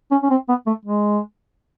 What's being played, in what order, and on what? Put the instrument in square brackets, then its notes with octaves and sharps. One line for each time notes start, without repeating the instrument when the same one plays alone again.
[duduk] C#4
C#4
C4
B3
A3
G#3